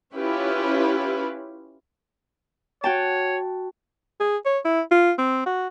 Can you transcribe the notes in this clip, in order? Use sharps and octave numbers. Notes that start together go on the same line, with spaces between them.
C#4 E4 F4 G4 B4
F#4 C#5 G5 A5
G#4
C#5
E4
F4
C4
F#4